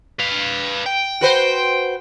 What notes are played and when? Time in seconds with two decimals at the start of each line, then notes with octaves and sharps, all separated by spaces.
0.19 B4 F5
0.86 G5
1.21 F#4 B4 C5